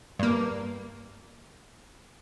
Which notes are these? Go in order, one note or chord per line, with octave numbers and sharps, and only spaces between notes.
G2 A#3